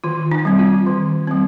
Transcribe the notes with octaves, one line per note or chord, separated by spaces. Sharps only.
D#3 F4
D#4
G3 C4
F4
D#3
G3 C4